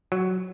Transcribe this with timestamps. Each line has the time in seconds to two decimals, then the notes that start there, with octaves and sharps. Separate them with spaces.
0.12 F#3